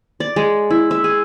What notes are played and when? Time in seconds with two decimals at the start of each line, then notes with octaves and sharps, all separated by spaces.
0.20 D5
0.36 G#3
0.70 E4
0.91 E5
1.04 G#4